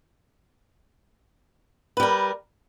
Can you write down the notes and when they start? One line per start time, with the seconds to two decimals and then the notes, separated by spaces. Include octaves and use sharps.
1.97 B4
2.00 G3
2.03 A#4